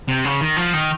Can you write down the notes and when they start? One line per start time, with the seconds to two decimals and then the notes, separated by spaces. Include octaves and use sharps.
0.08 C3
0.25 C#3
0.41 D#3
0.57 F3
0.73 D#3